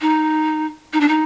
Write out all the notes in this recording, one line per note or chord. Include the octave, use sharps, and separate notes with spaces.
D#4
D#4
D4
D#4